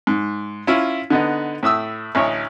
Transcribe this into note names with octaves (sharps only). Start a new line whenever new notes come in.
G#2
C#4 E4 F4
D3 B3 D#4
A2 E5 D#6 E6
A1 D2 C#5 D#5